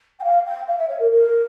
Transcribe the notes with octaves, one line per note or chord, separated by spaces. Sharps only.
G5
F5
G5
F5
E5
C#5
A#4
A#4